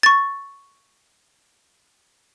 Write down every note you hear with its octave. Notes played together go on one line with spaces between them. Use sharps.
C#6 A6